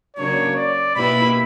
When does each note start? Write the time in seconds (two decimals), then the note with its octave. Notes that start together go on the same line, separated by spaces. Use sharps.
0.17 C#3 F#3 A#3 D4 C#5
0.56 D5
0.96 B2 A#3 E4 G4 B4 B5